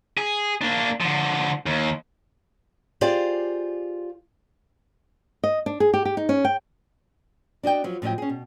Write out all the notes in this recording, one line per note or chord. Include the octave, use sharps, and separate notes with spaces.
G#4
A#3 D4
D3 F3
D#2
F4 G4 G#4 C5 D5 F5
D#5
D4
G#4
G4
G4
D#4
C#4
G5
D4 F#4 D#5 G5
F3 F#3
A2 F3 F#3 D#5 G5
C#4 G#4
B2